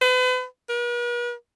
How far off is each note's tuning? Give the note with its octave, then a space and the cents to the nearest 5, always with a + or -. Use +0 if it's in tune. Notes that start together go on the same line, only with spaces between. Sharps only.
B4 +40
B4 -45